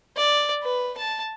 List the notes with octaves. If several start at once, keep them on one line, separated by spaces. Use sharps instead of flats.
D5
B4
A5